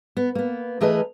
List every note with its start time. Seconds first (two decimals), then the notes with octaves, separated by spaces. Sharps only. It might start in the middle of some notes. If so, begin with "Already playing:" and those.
0.17 B3
0.35 A#3 B3
0.81 E3 A3 G#4 A#4 B4 D#5